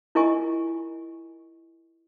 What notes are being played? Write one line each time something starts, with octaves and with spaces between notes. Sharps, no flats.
E4 F4 A#4 D#5 G#5 C#6